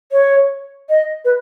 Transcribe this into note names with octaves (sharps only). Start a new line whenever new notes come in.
C#5
D#5
B4